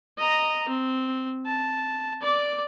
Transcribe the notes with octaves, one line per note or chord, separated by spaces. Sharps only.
D#5 A#5
C4
A5
D5 D6